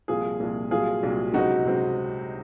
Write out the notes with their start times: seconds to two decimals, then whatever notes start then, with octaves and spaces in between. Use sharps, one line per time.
0.08 C2 A#2 F3 F4 G#4
0.40 C2 A#2 F3
0.71 C2 A#2 F#3 F4 G#4
1.03 C2 A#2 F#3
1.34 C#2 C3 F#3 C4 D#4 F#4
1.65 C#2 C3 F#3 C4